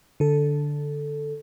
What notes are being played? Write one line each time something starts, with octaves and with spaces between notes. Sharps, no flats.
D3 A4